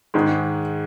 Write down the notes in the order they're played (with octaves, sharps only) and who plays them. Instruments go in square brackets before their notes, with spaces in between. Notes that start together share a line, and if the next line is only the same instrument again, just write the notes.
[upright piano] G#2 D#3 G#3